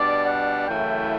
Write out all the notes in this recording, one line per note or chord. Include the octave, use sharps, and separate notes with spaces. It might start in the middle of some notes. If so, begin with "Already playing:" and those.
Already playing: B2 G3 D4 D5
F#5
F#2 C#3 E3 A3 E4 G5